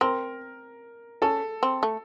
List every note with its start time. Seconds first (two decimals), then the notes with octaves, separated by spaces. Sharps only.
0.01 C4 A#4
1.22 C#4 A4
1.63 C4
1.83 A3